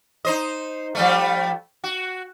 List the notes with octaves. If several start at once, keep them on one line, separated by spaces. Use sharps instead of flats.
D#4 C5 D#5
F3 G3 A3
F#4